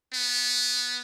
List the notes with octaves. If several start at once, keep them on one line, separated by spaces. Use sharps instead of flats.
B3